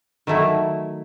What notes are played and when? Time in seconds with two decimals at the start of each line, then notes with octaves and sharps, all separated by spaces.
0.27 D#3 F#3 A3 E4